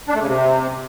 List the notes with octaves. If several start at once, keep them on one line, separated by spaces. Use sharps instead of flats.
D4
A3
C#3
C3